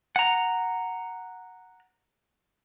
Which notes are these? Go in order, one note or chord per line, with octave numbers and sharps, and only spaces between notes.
F#5 A#5